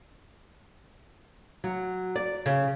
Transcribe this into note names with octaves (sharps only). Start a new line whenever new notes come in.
F#3
D5
C#3